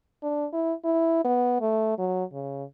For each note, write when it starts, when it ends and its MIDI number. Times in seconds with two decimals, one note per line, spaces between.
0.23 0.46 62
0.53 0.73 64
0.84 1.20 64
1.24 1.57 59
1.61 1.96 57
1.98 2.24 54
2.33 2.64 49